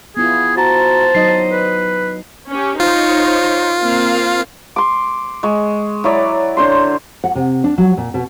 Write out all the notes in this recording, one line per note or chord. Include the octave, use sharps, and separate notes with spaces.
B3 E4 F4 G#4
F#4 C5 A5 A#5
F#3 D#4 D#5 C7
B4
C#4 G4
D#4 F4 C5 C#5
A#3 C4 F5
C6 D6
G#3 C#6
F#3 E4 C#5 D5
D3 C5 C6
F#5
C3
D4
F#3
A#2
B2